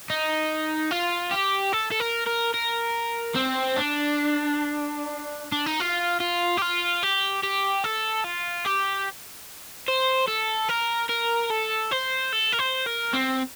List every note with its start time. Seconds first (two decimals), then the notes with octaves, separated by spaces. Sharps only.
0.10 D#4
0.91 F4
1.31 G4
1.73 A4
1.91 A4
2.00 A#4
2.26 A#4
2.54 A#4
3.36 C4
3.77 D4
5.52 D4
5.66 D#4
5.80 F4
6.20 F4
6.57 G4
6.62 F4
7.03 G4
7.43 G4
7.84 A4
8.24 F4
8.65 G4
9.88 C5
10.28 A4
10.69 A#4
11.09 A#4
11.50 A4
11.91 C5
12.33 A4
12.53 A#4
12.59 C5
12.86 A#4
13.13 C4